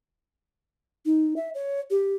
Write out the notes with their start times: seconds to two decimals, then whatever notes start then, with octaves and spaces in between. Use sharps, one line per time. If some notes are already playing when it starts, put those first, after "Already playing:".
1.06 D#4
1.36 E5
1.55 C#5
1.90 G4